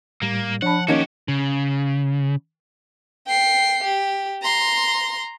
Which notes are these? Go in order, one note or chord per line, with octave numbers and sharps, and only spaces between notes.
A2 G3 A#3
F3 D4 F#5 A5 B5
D#2 A#3 C#4 D#4 F#4 G4 D#5
C#3
G5 C7
G4
A#5 C6